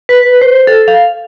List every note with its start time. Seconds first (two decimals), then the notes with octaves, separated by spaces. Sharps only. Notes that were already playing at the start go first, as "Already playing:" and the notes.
0.09 B4
0.41 C5
0.67 A4
0.88 F5